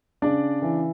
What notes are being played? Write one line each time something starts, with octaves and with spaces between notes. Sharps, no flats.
C#3 D4 D5
E3